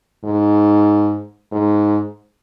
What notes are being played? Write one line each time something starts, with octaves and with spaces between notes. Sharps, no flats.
G#2
G#2